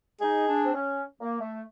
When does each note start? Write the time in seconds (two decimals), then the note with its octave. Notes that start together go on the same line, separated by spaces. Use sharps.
0.21 D#4 G#4
0.47 D4
0.64 C4
0.74 C#4
1.20 A#3
1.40 A3